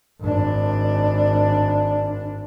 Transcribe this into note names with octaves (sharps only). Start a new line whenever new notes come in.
G#1 D4